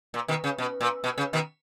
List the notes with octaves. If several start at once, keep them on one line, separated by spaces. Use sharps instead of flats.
A#2
B2 D#3
C#3
B2
A#2
B2
C#3
B2 D#3